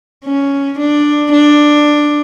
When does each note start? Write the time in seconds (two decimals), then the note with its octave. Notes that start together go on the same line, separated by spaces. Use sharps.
0.25 C#4
0.78 D4
1.32 D4